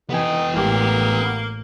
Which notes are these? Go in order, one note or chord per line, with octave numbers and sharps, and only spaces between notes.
C3 E3 B3 D#4 G5 G#5
A1 E3 G#3 A#3 G4